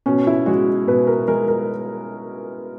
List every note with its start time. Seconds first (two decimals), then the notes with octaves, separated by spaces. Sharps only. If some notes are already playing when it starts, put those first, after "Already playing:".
0.06 B2 C#4
0.27 E4
0.46 G#3 F#4
0.87 B2 B4
1.07 A#4
1.28 G#3 A#4
1.48 A#4